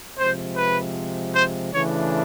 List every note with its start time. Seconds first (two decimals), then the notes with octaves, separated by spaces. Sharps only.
0.19 C3 F3 G#3 C5
0.57 B4
1.35 C5
1.73 C#3 E3 A3 D4 C#5